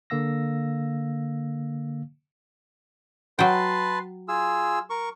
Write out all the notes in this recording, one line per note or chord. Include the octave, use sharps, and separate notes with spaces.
D3 A#3 F5 E6 A#6
F#3 B4 G5 A5 C6
F4 G#4 E6
A#4 C#6